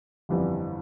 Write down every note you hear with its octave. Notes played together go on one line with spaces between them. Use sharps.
G1 F2 E3 G3 B3